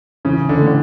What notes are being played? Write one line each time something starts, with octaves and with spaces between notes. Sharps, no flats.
C#3 E3
D3
A2
D3